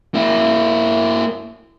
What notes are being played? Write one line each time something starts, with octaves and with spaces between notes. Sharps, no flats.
A#3 E4